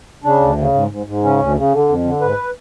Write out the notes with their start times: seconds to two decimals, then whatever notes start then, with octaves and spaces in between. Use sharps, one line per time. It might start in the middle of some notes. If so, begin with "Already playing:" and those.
0.24 C#3 D4
0.41 D2
0.58 C#3
0.74 G#2
0.91 G#2
1.06 G#2
1.23 C#3 C#4
1.39 D2
1.56 C#3
1.72 D3
1.89 F2
2.05 D3
2.21 G#2 B4